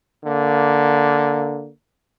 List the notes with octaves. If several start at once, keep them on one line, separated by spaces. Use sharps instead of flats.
D3 A#3